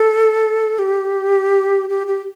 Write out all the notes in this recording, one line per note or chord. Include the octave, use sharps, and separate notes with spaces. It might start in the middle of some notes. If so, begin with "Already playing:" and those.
Already playing: A4
G4
G4
G4